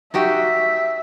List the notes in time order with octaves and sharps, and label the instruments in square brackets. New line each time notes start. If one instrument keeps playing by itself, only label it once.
[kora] D#4 F#4 G4 [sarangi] E5